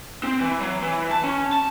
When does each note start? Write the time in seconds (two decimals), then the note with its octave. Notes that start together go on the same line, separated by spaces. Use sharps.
0.23 C4
0.40 E3
0.61 F#3
0.83 E3
1.11 A5
1.24 C#4
1.53 A5